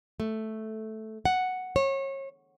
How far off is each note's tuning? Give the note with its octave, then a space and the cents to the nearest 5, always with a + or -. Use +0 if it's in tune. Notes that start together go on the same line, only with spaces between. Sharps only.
A3 -5
F#5 +0
C#5 -30